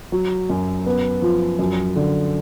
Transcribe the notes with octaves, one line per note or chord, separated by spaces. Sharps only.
F#3
F#2
B3
F3
F#2
D3